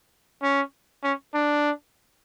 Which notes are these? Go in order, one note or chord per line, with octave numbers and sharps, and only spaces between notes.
C#4
C#4
D4